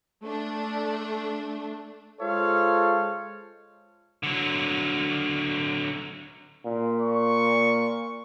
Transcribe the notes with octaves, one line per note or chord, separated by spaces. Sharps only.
A3 D4
G#3 F4 A4 C5 C#5 F5
D3 F#3
A#2
C#6